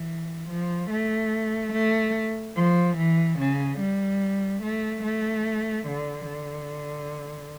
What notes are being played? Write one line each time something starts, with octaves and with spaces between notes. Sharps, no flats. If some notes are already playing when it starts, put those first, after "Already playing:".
Already playing: E3
F3
A3
A3
F3
E3
C#3
G3
A3
A3
D3
D3